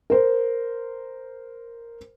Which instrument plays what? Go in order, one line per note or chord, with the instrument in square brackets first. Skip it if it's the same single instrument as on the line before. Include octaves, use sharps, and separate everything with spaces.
[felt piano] A#4 C5